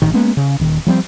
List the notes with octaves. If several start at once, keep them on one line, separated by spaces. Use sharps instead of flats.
A1 A2 D#3
G#3 A#3 B3 C#4
C#3
D#1 D#3
F3 G3 C4